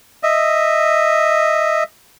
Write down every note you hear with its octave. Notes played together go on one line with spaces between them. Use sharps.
D#5 E5